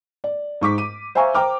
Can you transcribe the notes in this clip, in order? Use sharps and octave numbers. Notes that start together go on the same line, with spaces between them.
D5
G#2 C#6 D6 B6
D#7
C5 E5 F5 G#5 A#5 C#6
C5 G5 A#5 D6 F6